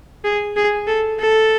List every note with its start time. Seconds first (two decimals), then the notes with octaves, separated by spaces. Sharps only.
0.24 G#4
0.57 G#4
0.87 A4
1.19 A4